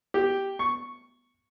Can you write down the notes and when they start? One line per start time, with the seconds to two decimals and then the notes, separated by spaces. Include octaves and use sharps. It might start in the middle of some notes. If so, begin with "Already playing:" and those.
0.14 G4
0.59 C#6